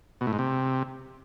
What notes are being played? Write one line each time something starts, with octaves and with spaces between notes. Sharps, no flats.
B2
A2
G#2
C3